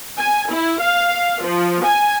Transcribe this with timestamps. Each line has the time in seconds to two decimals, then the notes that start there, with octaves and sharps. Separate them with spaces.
0.19 G#5
0.51 E4
0.81 F5
1.44 F3
1.85 G#5